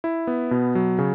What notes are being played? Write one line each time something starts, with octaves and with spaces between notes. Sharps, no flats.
E4
B3
B2
F#3
C#3